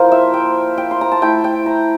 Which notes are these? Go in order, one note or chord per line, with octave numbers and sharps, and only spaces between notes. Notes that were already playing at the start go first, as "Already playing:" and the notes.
Already playing: F3 A#3 E4 A#4 C5
E5
G5
G5
C6
A#5
A5
A3 E4 G5
G5
A#5